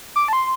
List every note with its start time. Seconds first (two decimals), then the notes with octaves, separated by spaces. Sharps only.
0.16 D6
0.28 A5
0.33 C6